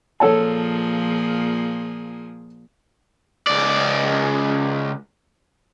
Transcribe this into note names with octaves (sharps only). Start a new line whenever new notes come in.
A#2 F3 G#4 A4 C#5 A5
C#2 D5